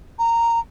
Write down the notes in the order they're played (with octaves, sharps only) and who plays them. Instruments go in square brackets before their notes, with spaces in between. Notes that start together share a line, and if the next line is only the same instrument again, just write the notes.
[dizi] A#5